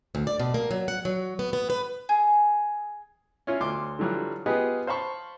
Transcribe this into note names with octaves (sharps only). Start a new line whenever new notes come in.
D2
D5
B2
A#3
F#3
F#5
F#3
B3
B3
B4
G#4
C#4 E4 F4 C#5
D2 C6 D6
D3 E3 F#3 G3 F4
B3 F4 G4 G#4 B4 D#5
C5 F5 A5 B5 C#6